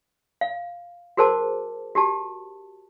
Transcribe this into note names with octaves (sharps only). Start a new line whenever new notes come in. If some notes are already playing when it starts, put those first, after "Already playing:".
F5
F#4 G#4 A#4 C5 A5 D6
F#4 G4 A5